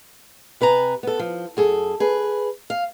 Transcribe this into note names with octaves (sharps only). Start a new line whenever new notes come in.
C3 B4 G#5 A#5
B3 A4
F3
F#2 G#4 A4
G#4 B4
F5